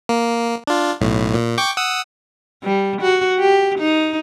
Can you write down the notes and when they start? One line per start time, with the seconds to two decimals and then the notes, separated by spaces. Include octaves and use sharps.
0.09 A#3
0.67 D4 F4
1.01 B1 A2
1.34 A#2
1.58 G5 C#6 D6
1.77 F#5 D#6 E6
2.63 G3
3.01 F#4
3.39 G4
3.78 D#4